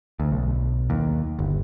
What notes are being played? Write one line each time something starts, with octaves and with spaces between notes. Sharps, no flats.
D2
B1
D#2
G1